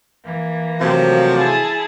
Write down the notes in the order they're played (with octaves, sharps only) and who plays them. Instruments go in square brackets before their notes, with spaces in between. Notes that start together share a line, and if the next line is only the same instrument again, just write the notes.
[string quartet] E3 A#3
[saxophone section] C3 F3 [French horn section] F#3 A3 F#4
[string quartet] E4 G#4 A5